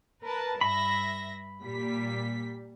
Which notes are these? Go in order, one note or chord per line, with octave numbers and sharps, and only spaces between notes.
A#4 B4 A5
G2 E5 B5 A#6
A#2 G3 B6